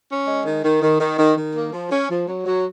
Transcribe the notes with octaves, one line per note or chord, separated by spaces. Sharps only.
C#4
G#3
D#3
D#3
D#3
D#3
D#3
D#3
A#3
F3
C#4
F3
F#3
F#3